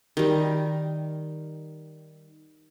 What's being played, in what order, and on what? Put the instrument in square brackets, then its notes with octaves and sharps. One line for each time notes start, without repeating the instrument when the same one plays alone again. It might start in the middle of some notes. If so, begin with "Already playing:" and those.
[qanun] D#3 G3